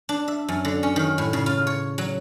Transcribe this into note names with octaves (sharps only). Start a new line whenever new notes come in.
D4
E5
F#2
D3
C#4
D#3
A2
C#3
F4
C#5
F#3